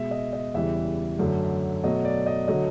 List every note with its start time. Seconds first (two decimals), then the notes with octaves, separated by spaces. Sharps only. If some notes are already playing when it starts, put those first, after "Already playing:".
Already playing: B2 G#3 E5
0.11 D#5
0.33 D#5
0.54 E2 C#3 E3 G3 E5
1.19 F#2 D3 F#3 A3
1.83 B2 F#3 A3 D#5
2.05 D5
2.26 D#5
2.48 D3 F#3 A3 D#5